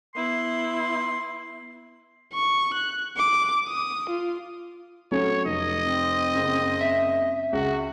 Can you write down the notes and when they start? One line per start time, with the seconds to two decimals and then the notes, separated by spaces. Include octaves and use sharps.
0.15 B3 E4 C6
2.34 C#6
2.74 F#6
3.17 D6
3.68 D#6
4.10 F4
5.11 F#3 A3 C#4 C#5
5.45 F1 D#5
5.83 C4
6.35 F#1
6.81 E5
7.53 C#2 F#4